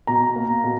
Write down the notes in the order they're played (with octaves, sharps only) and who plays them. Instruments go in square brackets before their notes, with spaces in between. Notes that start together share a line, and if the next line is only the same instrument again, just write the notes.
[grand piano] B2 A#5
A#3
B2